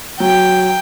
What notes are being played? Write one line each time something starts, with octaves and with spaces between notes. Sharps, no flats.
F#3 G5